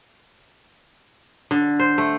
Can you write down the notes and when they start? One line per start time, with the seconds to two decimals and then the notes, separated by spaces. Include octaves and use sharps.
1.51 D3
1.79 C5
1.98 A3